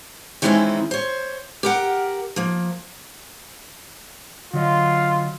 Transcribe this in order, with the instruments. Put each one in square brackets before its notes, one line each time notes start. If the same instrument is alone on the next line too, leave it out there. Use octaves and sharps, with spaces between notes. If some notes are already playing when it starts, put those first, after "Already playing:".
[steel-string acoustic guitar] D#3 E3 G#3 C4 C#4 E4
C5 C#5
G4 A#4 F#5
F3 A#3
[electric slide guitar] D3 F#3 D#5 [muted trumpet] F4